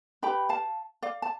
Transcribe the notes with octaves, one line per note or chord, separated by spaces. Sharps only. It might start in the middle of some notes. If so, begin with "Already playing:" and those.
D4 G4 B4 G5 B5
F5 A5
D5 F5
A5